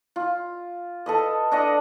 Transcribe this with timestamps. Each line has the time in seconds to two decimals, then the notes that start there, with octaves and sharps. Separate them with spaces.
0.16 F4
1.06 A4 B4 D#5
1.51 D4 D#5 F#5